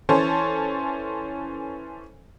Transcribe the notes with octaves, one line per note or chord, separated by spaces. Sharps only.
E3 C#4 A4 C5 C#5